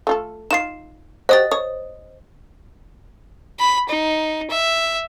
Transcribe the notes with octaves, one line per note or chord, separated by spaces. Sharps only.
A3 F4 A4
D#4 F4 C7 E7
F#4 G4 C5 D#5 D#6 A6
C#5 D#6
B5
D#4
E5